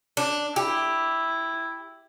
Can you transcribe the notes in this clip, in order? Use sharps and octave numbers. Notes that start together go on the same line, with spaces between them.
D4
E4 G4